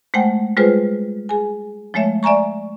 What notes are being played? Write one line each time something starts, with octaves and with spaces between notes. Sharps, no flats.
G#3 A3 C5 F#5 G5
G3 G#3 F4 G#4 B4 C5
G#4 G#5
F3 G#3 A3 C#5 E5
D5 E5 G#5 A#5 C#6